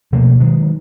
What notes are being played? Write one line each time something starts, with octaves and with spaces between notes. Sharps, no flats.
B2 F3 A3 A#3
D#3 F#3 G#3